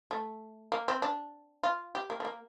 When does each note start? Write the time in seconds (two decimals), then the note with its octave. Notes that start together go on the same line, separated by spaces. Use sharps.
0.11 A3
0.72 A#3
0.88 C4
1.02 D4
1.63 F4
1.95 G4
2.10 A#3
2.20 A3
2.25 A#3